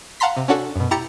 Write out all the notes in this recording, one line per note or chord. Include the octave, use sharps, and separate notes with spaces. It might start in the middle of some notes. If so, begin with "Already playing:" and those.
F5 F#5 A5 A#5 C6 B6
C3
C#4 D4 F#4 A4
F#2 B2
E4 G4 A#5 A6 C#7